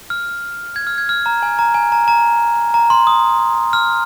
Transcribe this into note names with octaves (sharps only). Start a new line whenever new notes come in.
F6
G#6
F6
G#6
F6
A#5
G#5
A#5
G#5
A#5
A#5
A#5
C6
D#6
F6